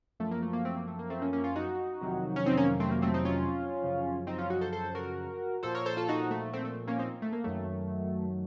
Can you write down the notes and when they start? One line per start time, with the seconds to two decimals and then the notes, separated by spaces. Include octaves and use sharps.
0.19 F#2 F3 A3
0.31 A#3
0.42 A3
0.53 A#3
0.65 A3 C4
0.77 A#3
0.87 A3
0.99 A#3
1.10 A3 C4
1.22 A#3 C#4
1.33 A#3 C#4
1.44 C#4 F4
1.56 D#4 F#4
2.01 F2 C3 D#3 F#3
2.36 C#4
2.46 C4 D#4
2.57 A#3 C#4
2.80 A3 C4
2.91 A#3
3.02 A3 C4
3.14 C4 D#4
3.25 C#4 F4
3.82 F#2 C#3 F3
4.27 C4 D#4
4.38 C#4 F4
4.50 D#4 F#4
4.61 A4 C5
4.72 A4 C5
4.95 F#4 A#4
5.63 A#2 F3 A4 C5
5.74 A#4 C#5
5.86 A4 C5
5.97 F4 A4
6.08 D#4 F#4
6.31 A3
6.53 A3 C4
6.65 A3
6.87 A#3 C#4
6.99 C4 D#4
7.22 A3
7.33 A#3
7.44 F#2 D#3 F#3 A3